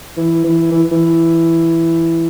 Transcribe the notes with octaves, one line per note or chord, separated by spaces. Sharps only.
E3
E3
E3
E3